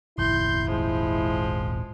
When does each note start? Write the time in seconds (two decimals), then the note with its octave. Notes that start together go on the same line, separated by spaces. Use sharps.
0.18 D#1 G#1 E4 C6 G6
0.68 F3 G#3